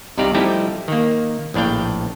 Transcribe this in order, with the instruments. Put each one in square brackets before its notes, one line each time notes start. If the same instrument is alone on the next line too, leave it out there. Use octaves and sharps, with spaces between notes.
[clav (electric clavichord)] C2 C3 D#4 G4 D5 F5
F3 G3 A3 D#4 E4 G4
D#3 A#3
A#1 A2 D4 F5 G5